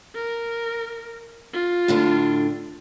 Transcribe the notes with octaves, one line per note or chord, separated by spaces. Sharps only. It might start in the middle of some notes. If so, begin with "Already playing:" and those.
A#4
F4
A2 D3 D4